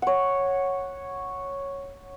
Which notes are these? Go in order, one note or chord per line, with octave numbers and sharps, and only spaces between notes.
C#5 F#5